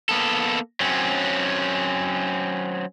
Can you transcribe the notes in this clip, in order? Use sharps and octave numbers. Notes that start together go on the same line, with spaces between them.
A#3 B3 A4
F#3 C4 C#4